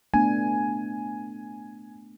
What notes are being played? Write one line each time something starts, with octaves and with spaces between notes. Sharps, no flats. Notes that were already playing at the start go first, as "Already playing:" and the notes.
A3 B3 D4 G#5